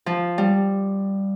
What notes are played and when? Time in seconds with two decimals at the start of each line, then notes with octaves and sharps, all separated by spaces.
0.06 F3
0.38 G3